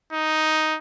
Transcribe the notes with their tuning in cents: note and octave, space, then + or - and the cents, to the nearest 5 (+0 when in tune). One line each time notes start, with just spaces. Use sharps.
D#4 +5